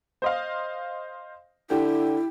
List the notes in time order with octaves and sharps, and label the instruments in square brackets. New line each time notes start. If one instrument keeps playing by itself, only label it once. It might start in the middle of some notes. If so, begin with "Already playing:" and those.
[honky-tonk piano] C5 D#5 F5
[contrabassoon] D3 [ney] E4 [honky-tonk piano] G4